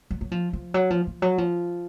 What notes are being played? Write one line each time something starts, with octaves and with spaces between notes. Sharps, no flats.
F#3
F#3
F3
F3
F#3
F3
F3
F#3
F3